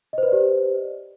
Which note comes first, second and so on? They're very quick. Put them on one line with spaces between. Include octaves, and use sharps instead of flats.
D#5 C5 B4 D5 G4